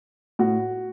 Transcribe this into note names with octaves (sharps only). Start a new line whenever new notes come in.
A2 F#4